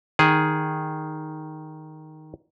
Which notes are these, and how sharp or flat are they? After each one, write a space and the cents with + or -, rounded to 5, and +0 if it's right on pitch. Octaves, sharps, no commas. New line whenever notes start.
D#3 +0 G#4 +0